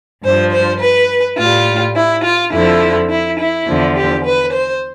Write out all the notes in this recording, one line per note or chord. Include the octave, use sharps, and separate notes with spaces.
G2 F3 C5
C5
B4
A2 G3 F4
E4
F4
F2 D3 F3 E4
E4
E4
E2 D3 F3
G4
B4
C5